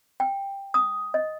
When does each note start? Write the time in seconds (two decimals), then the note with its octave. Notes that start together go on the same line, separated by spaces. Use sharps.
0.20 G5
0.74 D#6
1.14 D#5